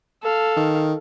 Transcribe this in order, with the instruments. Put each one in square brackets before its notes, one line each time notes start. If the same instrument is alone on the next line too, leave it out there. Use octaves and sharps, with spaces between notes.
[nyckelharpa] A4 F5
[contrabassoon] D#3